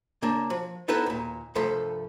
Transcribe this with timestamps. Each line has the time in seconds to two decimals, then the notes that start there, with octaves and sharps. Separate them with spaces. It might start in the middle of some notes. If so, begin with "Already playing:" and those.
0.22 C#3 A#3 D4
0.50 F3
0.88 B3 D#4 E4 A4 B4 A5
1.06 D#2 A#2
1.55 C2 G2 F3 A3 A4 C6